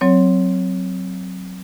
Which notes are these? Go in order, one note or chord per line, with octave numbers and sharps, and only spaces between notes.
F#3 C4 C#5